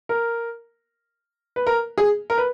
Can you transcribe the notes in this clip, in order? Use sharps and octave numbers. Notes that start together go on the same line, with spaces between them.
A#4
B4
A#4
G#4
A#4
B4